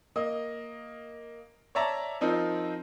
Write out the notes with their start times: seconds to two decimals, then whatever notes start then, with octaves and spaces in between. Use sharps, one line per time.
0.16 A#3 D#5
1.75 C#5 D5 E5 A5 A#5
2.21 F3 C4 D#4 A#4